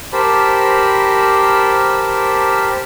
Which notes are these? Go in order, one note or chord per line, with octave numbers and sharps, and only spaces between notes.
G4 A#4 C5 A5 B5